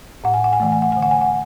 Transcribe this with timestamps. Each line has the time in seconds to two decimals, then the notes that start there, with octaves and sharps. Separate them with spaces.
0.24 A2 F#5
0.34 G#5
0.44 F#5
0.53 G#5
0.60 E3 A3 F#5
0.72 G#5
0.82 F#5
0.92 D3 G#5
1.02 F#5
1.11 G#5
1.21 F#5